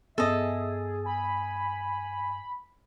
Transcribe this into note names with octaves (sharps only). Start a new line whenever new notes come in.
G2 B3 G#4 A4 D#5 E5
G#5 B5